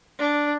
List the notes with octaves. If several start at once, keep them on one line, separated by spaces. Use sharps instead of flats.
D4